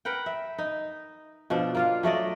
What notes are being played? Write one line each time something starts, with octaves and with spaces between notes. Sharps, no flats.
A#4 B4 F#5 G5
E5
D#4
B2 F3 D4
A#3 F4 F5
F#3 A3 D5 D#5